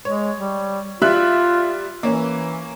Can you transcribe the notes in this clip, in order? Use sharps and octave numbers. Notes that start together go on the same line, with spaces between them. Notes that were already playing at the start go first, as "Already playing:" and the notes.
G#3 C#5
G3
G3 F4 E5 F#6
E3 A#3 C#4